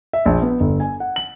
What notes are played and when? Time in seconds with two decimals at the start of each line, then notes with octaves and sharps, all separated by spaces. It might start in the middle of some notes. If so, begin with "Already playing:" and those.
0.13 E5
0.26 A#1
0.42 B3
0.60 G1
0.80 G#5
1.00 F#5
1.16 F#7